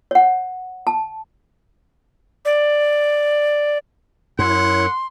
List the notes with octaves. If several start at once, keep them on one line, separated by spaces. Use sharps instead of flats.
C#5 F#5
A5
D5
F#2 E4 C#5 F#5 C6